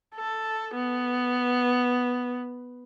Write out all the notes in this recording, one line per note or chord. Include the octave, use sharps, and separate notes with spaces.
A4
B3